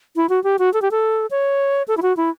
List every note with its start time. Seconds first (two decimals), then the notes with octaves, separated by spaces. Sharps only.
0.16 E4
0.29 F#4
0.44 G4
0.59 F#4
0.74 A4
0.82 G4
0.91 A4
1.31 C#5
1.88 A4
1.97 E4
2.02 F#4
2.17 E4